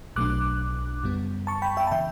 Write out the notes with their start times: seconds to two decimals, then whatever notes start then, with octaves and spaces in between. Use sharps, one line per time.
0.16 B1 B2 F#3 A3 D4 D6 F#6
1.04 F#2 C#3 G3 B3
1.47 A5 C#6
1.62 G5 B5
1.77 E5 G5
1.87 A5
1.91 C#3 E3 E5 G5